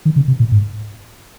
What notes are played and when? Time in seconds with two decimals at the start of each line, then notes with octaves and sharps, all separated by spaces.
0.05 D#3
0.16 C#3
0.28 C3
0.40 A#2
0.52 G#2